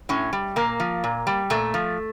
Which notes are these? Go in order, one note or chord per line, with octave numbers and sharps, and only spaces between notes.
A2 C#4
G3
A#2 A#3
F3
A#2
G3
A#2 A3
F3